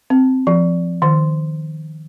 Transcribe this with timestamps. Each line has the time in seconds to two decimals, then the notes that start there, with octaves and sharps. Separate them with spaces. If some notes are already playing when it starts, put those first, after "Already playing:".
0.10 C4
0.47 F3
1.02 D#3